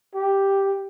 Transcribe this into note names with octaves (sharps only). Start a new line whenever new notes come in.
G4